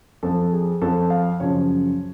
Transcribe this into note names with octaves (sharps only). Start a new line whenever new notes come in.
F2 F3 A4
G#4
F2 F3 A4
F5
F#2 C#3 F3 C#5